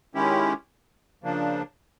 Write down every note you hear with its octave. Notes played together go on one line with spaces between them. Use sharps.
D#3 G#3 C#4 E4 G4
C#3 F3 A#3 D4